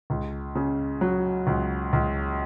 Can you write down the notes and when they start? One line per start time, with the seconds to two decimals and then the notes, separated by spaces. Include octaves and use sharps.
0.10 C#2
0.55 C#3
1.01 F#3
1.47 C#2
1.93 C#2